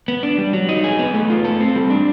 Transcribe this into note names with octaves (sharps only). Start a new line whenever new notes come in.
B3
D4
G3
F#3
D#4
G#4
B3
A3
F4
A4
C4
G3
D4